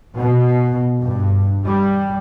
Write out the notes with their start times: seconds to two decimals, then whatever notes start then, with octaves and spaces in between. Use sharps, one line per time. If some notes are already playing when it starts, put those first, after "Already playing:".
0.17 B2
1.02 G2
1.64 G3